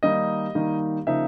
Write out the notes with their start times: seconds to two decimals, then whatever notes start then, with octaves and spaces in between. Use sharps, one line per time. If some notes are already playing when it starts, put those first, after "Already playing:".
0.03 D#3 G3 A#3 D#4 D#5
0.55 D#3 G3 A#3 D#4
1.07 C#3 F3 A#3 D#4 E5